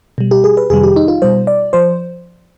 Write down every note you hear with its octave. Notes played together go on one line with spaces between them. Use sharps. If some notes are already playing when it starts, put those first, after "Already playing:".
B2 G3
G4
G#4
B4
F2 C3 D#3 G3 G#4
G4
D#4
F4
B2 G3 C5
D5
F3 C5